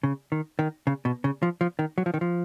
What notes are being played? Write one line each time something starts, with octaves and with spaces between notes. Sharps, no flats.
C#3
D#3
D#3
C#3
B2
C#3
F3
F3
D#3
F#3
F3
D#3
F3